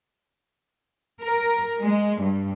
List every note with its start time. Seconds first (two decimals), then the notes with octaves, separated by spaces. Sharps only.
1.21 A#4
1.80 G#3
2.21 G2